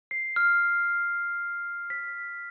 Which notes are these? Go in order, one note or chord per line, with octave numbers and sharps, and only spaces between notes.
C7
F6
B6